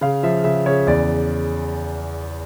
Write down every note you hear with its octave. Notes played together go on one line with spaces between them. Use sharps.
C#3 F5
F3 E5
C#3 E5
C#3 C#5
E2 D5